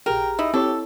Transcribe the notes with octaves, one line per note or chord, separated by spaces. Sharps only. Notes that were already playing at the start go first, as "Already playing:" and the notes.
A#1 G4 G#4 A#4 G5
D#4 E4
C4 E4 G4 A4 C#5